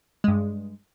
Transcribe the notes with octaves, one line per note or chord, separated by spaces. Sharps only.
G2 G#3